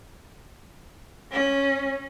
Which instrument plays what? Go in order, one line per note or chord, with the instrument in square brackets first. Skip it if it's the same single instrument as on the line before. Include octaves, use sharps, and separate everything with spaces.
[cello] C#4